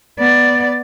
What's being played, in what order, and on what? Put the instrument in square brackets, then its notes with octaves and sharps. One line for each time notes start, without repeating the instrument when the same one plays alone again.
[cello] B3 D5